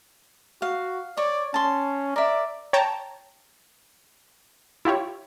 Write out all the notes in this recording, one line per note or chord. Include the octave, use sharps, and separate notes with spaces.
F#4 F5
C#5 D5
C#4 A5 C6
A#4 D5 E5
C#5 G5 A5 A#5
E4 F4 G4 C#5